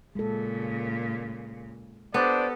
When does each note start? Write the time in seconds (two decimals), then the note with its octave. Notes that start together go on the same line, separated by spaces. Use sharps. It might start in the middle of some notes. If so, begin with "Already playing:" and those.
0.15 A#2 C#3 G#3 A4
2.14 B3 D4 G4 A4 C5 D5